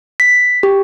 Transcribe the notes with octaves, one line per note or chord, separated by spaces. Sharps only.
B6
G4